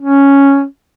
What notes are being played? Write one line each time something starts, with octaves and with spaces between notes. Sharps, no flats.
C#4